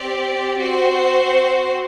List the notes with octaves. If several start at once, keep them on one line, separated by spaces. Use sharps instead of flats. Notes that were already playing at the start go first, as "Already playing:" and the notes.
Already playing: C4 G4 D5
C4 F#4 C5